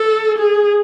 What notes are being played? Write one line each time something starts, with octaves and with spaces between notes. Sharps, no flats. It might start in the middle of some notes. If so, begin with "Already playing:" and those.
Already playing: A4
G#4